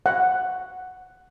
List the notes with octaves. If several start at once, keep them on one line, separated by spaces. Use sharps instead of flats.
F#5